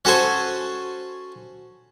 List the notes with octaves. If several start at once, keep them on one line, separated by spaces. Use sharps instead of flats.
C#4 F#4 A4 C5 G#5